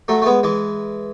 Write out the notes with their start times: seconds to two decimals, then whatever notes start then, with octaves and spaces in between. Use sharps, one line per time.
0.08 F#3 A3
0.22 A3
0.26 G#3 B3
0.43 E3 G#3